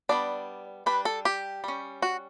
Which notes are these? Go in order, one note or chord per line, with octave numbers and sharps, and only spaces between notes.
G3 B3 D4 D5
G3 D4 B4
A4
G4
G3 C#4
F#4